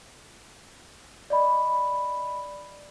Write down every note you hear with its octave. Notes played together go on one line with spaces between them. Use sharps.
D5 D#5 B5